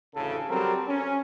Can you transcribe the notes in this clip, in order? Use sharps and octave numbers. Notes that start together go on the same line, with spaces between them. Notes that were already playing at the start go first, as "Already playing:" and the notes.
A1 D2 C#3 A4
F#3 G3 C4 A4 A#4
C#4